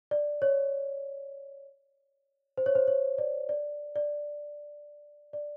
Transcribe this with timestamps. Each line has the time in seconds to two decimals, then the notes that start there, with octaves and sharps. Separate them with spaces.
0.11 D5
0.42 C#5
2.57 C5
2.66 C#5
2.75 C5
2.88 C#5
3.18 D5
3.49 D5
3.96 D5
5.33 D5